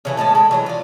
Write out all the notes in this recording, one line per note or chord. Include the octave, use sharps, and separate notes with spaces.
C#3 E3 A3
A2 G#3 B3 A5
G#3 A4
E3 F#3 A3
F4 D5